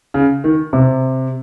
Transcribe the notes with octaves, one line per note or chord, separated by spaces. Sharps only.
C#3
D#3
C3